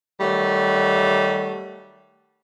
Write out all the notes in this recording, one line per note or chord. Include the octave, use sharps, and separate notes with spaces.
D#3 F#3 G3 A3